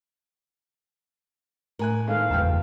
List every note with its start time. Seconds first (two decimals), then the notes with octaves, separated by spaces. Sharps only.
1.79 A2 A#4 G#5 F#6
2.08 G#2 D#3 A3 F5
2.31 F#1 E2 G#3 B4 G5 A5